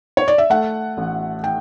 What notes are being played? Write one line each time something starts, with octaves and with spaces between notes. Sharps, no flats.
C#5
D5
E5
A3 F#5
A1
G5